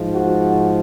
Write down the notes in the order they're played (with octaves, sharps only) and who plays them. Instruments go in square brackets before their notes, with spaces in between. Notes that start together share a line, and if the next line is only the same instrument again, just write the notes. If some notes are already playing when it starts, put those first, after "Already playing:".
Already playing: [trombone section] G#2 F3
F#4